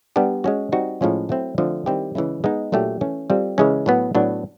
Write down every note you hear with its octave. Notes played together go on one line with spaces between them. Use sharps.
G3 B3 D4 G4
G#3 C#4 F#4
G3 C4 D#4 F#4
A2 F3 G#3 C#4 F4
F#3 A3 C4 E4
D3 F3 A3 C4
D#3 G3 C4 E4 G4
C#3 E3 G#3 C#4 E4
G#3 B3 D#4
A#2 F#3 A3 D4 G4
E3 A3 C#4
G3 C4 F4 A4
C#3 E3 G#3 C#4
A2 F#3 B3
A2 F#3 B3 D4